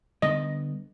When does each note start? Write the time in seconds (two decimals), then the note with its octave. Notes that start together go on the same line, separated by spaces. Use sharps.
0.22 D3 G3 B3 D#5